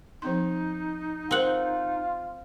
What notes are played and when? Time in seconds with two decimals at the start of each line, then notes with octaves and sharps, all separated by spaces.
0.22 F3 C4 D#4 C6
1.31 C4 F4 A#4 C5 F#5